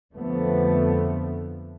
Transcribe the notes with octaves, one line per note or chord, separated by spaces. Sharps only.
F2 D3 F3 A3 B3